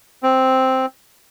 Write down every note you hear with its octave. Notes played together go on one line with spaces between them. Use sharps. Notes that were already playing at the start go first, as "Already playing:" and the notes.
C4